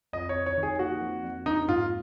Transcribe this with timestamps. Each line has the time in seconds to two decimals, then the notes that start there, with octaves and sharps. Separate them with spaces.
0.13 F2 D#5
0.29 C#5
0.36 F2
0.46 C#5
0.57 D#3
0.63 G#4
0.79 A#3 F#4
1.02 F2
1.24 F2
1.46 A#3 D#4
1.68 G#2 F4